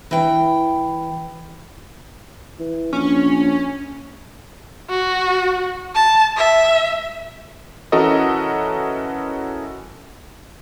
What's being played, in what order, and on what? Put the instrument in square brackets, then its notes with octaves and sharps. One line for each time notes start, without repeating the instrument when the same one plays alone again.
[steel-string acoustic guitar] E3 G5
[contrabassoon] E3
[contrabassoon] A#1 [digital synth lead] C#4
[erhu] F#4
A5
E5
[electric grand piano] E3 C#4 F#4 A4 A#4 D#5